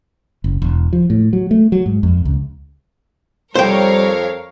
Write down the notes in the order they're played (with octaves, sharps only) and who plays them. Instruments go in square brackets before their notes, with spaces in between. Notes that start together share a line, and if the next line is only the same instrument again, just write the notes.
[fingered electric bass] F#1
E1
F3
A2
F#3
A3
F#3
G#2
F2
C#2
[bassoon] F2 [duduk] G3 [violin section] A#4 C#5 F5 [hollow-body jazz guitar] C5 G5